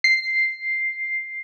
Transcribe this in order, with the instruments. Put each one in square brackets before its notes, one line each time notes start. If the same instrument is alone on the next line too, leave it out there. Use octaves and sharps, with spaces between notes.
[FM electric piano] C7